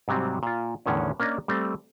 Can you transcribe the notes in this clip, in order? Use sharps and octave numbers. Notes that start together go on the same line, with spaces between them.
G#2 C3 F#3 G3 C4
A#2 F4
E2 A2 D3 D#3 C#4
A#3 C#4 D4 A#4 D5 D#5
G3 A3 C4